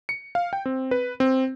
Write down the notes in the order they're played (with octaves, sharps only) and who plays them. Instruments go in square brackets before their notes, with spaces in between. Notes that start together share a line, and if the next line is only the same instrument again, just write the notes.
[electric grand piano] C#7
F5
G5
C4
B4
C4